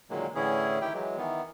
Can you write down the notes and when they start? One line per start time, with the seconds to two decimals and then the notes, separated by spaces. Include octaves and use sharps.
0.10 A#2 D3 D#3 F#3 G#3 A#3
0.35 A2 D3 E3 C#4 E4 G#4
0.81 D#3 E4 G4 G5
0.93 E3 F#3 G#3
1.17 D#3 E3 B3